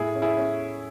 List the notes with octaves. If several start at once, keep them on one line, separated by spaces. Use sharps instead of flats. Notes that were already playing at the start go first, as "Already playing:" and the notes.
Already playing: A2 E4 G#4
C#4
E4 G#4
C#4